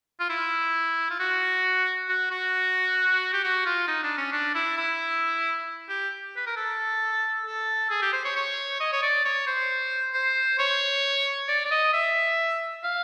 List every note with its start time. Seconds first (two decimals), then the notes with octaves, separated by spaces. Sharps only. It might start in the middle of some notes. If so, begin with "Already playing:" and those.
0.20 F4
0.29 E4
1.10 F4
1.20 F#4
2.09 F#4
2.31 F#4
3.33 G4
3.44 F#4
3.66 F4
3.88 D#4
4.03 D4
4.18 C#4
4.32 D4
4.55 E4
4.77 E4
5.89 G4
6.36 B4
6.47 A#4
6.57 A4
7.46 A4
7.90 G#4
8.02 G4
8.13 C5
8.25 C#5
8.36 C#5
8.80 D#5
8.93 C#5
9.02 D5
9.25 C#5
9.47 C5
10.14 C5
10.59 C#5
11.48 D5
11.65 D5
11.71 D#5
11.93 E5
12.84 F5